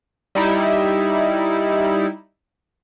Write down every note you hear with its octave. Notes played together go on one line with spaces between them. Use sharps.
G3 D#4 E4